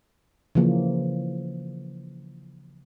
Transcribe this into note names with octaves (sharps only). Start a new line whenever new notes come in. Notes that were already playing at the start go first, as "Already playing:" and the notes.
C#3 E3 F3 A#3